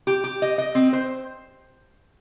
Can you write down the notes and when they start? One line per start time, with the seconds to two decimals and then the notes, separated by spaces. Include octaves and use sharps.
0.07 G4
0.24 G4
0.42 D#5
0.58 D#5
0.75 C4
0.93 C5